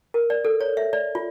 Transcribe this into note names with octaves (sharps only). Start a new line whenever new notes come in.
A#4
D5
A4
C#5
E5
D5
F4